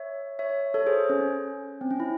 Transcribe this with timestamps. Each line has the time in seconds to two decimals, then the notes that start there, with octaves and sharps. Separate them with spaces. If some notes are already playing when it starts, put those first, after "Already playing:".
Already playing: C#5 E5
0.39 C#5 E5
0.74 A4 C#5
0.86 G#4 C5
1.10 C#4
1.81 C4
1.91 C#4
2.00 E4